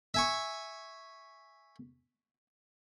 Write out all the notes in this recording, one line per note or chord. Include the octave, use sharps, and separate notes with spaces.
E5 G#5 C#6